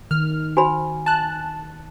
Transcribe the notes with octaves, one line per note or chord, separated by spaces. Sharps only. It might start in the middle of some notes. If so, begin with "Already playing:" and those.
D#3 F6
F#4 C5 G#5 B5
A5 F#6